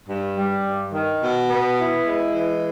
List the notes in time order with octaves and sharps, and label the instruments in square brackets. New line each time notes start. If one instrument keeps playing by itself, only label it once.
[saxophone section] G2
G3
G2
D#3
B2
B3
E4
G#3
E3